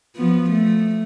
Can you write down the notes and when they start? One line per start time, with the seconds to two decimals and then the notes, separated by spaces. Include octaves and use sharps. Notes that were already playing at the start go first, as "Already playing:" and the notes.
0.16 F3 B3
0.50 A3